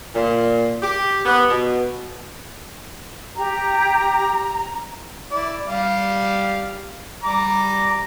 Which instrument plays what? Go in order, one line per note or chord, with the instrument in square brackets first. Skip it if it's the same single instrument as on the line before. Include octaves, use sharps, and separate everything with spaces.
[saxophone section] A#2
G4
B3
B2
[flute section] G4 [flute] A#5
[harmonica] E4 D5
G3 G4 F5
G3 A#5 D6